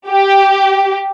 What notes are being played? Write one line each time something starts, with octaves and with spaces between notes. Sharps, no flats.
G4